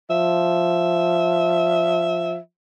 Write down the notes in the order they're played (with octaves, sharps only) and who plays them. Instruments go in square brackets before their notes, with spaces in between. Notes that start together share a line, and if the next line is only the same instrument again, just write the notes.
[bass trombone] F3 [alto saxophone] E5